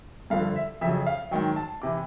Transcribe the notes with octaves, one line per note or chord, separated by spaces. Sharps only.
G2 D3 F3 F5
E5
F2 C#3 F#3 E5
F5
G#2 D#3 F#3 G5
A5
C3 E3 D6